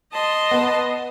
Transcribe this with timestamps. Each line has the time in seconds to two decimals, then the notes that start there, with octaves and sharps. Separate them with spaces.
0.11 D#5 A5 C6
0.51 B3 B4